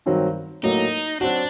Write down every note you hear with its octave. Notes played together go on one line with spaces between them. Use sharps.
G2 D#3 F#3 C4
A2 F#3 A#3 D#4
F#3 C4 D4 F#4